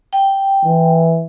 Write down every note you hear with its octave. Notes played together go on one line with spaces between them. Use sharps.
G5
E3